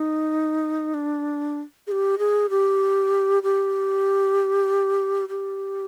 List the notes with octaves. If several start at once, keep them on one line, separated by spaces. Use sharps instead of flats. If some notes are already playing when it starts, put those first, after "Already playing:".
Already playing: D#4
D4
G#4
G4
G#4
G4
G4
G4